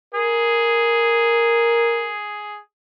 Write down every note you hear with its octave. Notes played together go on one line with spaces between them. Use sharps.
G#4 A#4